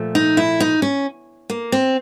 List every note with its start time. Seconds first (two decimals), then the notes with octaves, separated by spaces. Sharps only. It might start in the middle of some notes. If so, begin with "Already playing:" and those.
Already playing: A#2 F3 A3
0.15 D#4
0.37 E4
0.60 D#4
0.82 C#4
1.50 A#3
1.72 C4